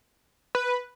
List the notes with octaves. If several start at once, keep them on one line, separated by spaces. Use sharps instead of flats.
B4